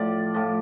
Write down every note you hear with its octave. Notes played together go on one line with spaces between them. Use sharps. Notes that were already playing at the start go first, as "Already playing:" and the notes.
Already playing: A2 F3 D5
A2 F3